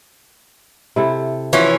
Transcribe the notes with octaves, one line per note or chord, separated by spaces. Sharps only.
C3 E4 A4
E3 F3 C#4 F4 F#4